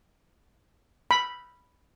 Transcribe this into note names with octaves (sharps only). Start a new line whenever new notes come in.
B5